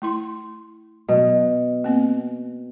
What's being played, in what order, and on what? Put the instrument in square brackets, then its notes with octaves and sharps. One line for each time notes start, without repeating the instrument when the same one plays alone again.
[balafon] A3 E4 C6
[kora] B2 [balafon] F#3
[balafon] A#3 C4